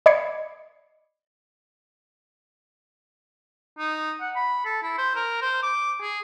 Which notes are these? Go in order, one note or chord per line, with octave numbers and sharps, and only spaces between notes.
D5 D#5 B5 G#6 C7 C#7
D#4
F#5
B5
A4
E4
C5
A#4
C5
D6
G#4